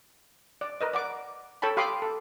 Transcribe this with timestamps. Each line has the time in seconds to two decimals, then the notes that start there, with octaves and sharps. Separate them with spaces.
0.61 D5
0.81 A#4 B4 D#5
0.93 D5 F#5 D6
1.62 A4 C#5 G5 A5 B5
1.77 G4 F5 B5 C6 D6 D#6
2.02 A4